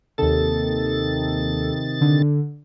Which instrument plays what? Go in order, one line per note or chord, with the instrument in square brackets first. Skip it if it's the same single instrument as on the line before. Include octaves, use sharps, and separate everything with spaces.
[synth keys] D#2 A4 [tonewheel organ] C3 D#3 A6
[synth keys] D3